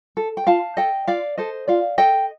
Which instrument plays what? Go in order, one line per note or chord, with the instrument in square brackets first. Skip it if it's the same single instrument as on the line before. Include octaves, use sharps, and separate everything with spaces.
[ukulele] A4
G5
F4 F5 A5
A4 D#5 G5
F4 D5 F5
A4 C5 D#5
F4 D5 F5
A4 D#5 G5